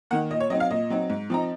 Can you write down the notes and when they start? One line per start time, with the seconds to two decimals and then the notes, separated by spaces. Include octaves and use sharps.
0.11 D#3 A#3 F#5
0.30 A#2 D#5
0.40 C#5
0.50 F#3 C4 D#4 D#5
0.60 F5
0.70 A#2 D#5
0.90 F#3 C4 D#4
1.10 G#2
1.30 F3 C4 D#4 A#5